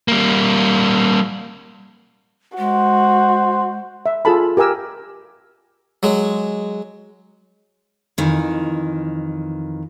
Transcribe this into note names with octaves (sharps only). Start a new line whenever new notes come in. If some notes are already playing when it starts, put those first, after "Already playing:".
G3 A#3
G#3 F#4 C5
E5
F4 G#4 A4 A5 B5
G4 A#4 G#5 E6
F#3 G#3
F2 D#3 E3